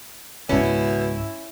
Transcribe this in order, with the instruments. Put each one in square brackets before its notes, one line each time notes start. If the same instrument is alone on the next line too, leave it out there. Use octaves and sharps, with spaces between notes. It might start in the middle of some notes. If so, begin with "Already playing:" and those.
[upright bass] C#2 G#2 [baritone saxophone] B2 [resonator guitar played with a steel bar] C#4 [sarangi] E4